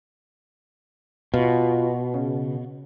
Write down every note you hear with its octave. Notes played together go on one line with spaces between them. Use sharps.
B2 F4
C#3